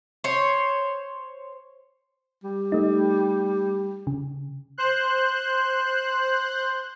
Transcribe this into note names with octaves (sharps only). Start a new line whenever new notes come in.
C5 C#5
G3
A3 D#4
C#3
C5 F#6